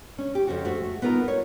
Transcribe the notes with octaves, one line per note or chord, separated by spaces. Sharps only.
C#4
G4
F2 C#3 F#4
A3 F#4
B3 D#4 F4 A#4
C#5